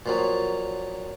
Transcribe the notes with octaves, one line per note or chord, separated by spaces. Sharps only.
A#2 F3 F#3